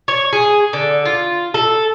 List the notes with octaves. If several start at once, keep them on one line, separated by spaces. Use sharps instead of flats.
C#5
G#4
D3
F4
A4